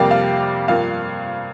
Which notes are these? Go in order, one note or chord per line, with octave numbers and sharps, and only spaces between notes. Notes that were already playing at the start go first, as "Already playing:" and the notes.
Already playing: F2 C3 G3 A#3 F5
F5
G2 F3 A#3 F5